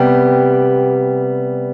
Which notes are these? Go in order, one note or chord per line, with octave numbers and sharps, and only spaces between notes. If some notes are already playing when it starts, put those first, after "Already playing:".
Already playing: C3 G3 B3 G5